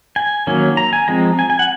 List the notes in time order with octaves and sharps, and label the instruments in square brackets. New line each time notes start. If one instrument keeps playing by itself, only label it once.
[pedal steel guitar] G#5
D#3 F#3 A#3 C#4
A#5
G#5
F3 G#3 C4 A#5
G#5
G#5
F#5